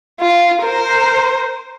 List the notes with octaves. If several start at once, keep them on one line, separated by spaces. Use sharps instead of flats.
F4
A#4 C5